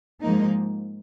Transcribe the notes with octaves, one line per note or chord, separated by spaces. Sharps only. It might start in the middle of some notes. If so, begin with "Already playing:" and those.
G#2 F3 A#3 D#4